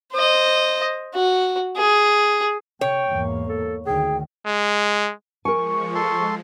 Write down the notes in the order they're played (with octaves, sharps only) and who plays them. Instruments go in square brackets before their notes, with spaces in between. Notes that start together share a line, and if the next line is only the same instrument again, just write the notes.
[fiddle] C5 D#5
F#4
G#4
[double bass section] C3 [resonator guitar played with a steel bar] C#5 [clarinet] G5
[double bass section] E2 G#2 A#3
[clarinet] A4
[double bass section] D2 D3 D#3 [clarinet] G#4 [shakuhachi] G5
[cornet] G#3
[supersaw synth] F3 G#3 [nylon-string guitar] A#4 G#5 [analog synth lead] C#6
[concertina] A4 C6